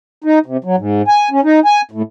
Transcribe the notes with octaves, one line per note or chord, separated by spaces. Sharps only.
D#4
C3
F#3
G#2
G#5
C#4
D#4
G#5
A2